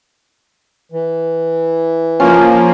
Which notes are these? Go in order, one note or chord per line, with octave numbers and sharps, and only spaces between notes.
E3
F3 A#3 C#4